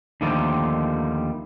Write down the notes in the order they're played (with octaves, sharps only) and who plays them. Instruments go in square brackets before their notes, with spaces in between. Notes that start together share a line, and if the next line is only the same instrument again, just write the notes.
[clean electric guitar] D#2 D3 D#3 F3 G3 A3